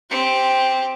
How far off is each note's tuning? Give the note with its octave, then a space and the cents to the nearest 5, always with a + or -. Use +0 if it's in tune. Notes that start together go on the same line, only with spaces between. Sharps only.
C4 +0 G4 +0